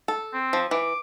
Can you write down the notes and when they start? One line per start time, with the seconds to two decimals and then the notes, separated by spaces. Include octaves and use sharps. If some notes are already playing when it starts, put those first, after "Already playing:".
0.08 A4
0.34 C4
0.53 F3
0.71 E3 D6